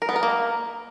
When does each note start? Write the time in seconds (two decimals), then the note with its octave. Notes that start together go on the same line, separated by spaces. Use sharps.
0.02 A#4
0.09 B3
0.16 A#4
0.23 A#3